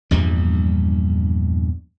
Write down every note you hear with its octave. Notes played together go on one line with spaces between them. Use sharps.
A#1 E2 G2 G3